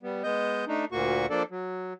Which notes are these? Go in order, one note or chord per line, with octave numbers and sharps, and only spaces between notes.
G3 B3
G#3 B3 D#5 G6
A3 D4 D#4
D2 A#2 A#3 F#4 C#6
F3 A#3 D4 A4 D5
F#3